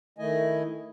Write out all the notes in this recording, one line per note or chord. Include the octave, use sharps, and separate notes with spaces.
D#3 A3 E4 D#5 G#5